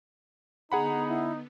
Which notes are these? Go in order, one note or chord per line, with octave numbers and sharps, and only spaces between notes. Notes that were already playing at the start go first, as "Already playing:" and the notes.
D3 B3 D#4 G#4 F#5 A#5 B5
E4